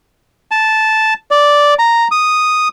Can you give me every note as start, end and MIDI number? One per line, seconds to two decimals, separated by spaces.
0.51 1.14 81
1.31 1.74 74
1.79 2.08 82
2.11 2.68 87